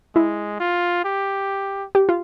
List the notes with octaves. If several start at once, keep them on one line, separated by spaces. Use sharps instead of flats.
G#3 E4
F4
G4
G4
F4